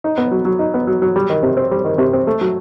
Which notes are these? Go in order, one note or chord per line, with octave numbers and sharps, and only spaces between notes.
D#4
B3
F#3
F#3
D#4
B3
F#3
F#3
G3
D#3
C3
C4
G3
D#3
C3
C4
A3
F#3